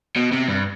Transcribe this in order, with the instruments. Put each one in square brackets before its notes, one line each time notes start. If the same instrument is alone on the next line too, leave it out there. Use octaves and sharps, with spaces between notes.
[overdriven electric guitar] B2
C3
G2